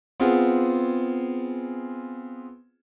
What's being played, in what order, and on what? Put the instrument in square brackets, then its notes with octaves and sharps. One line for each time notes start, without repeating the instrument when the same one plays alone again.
[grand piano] B3 C4 F4 G#4